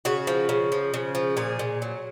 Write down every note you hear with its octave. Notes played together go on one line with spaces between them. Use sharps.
C#3 F#4
F3
C#3
F3
C#3
F3
A#2 G#4
A#2
F#3